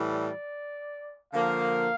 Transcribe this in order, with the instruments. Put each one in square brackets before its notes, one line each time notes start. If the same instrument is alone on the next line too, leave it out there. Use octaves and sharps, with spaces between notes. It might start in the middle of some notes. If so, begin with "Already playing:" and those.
Already playing: [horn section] A2 E3 G3
[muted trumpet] D5
[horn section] D3 F3 A#3 [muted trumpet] F5